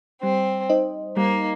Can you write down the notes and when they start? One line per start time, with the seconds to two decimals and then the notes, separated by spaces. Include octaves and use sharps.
0.22 G3 C4
0.69 D#4 C5 D#5
1.17 G3 A#3